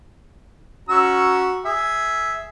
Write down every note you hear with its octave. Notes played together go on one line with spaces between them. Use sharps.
C#4 F#4 A#5 E6
G#4 E5